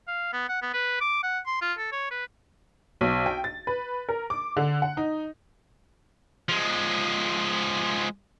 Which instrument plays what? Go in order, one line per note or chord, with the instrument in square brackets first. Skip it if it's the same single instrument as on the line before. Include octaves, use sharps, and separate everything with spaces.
[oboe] F5
B3
F#5
B3
B4
D6
F#5
C6
F4
A4
C#5
B4
[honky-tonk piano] B1
G5
A6
B4
A#4
D6
D3
F#5
D#4
[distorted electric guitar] F3 G#3